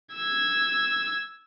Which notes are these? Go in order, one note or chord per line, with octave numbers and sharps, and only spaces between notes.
E6 G#6